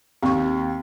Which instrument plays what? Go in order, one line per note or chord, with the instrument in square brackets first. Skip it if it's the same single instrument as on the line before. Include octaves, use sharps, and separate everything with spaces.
[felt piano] D#2 [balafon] C4 C#6